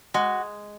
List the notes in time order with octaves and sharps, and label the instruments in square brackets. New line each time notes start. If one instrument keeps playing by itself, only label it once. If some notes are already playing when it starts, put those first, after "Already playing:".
[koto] G#3 [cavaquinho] F#4